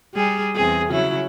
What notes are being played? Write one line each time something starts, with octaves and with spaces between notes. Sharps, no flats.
G3 G#4
E2 C4 G#4
C#3 F#3 E4